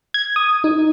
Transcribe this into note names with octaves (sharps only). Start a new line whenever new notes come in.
G#6
D#6
D#4